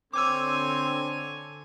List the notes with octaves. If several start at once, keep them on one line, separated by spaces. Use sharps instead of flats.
D3 C4 C#5 G#5 D6 E6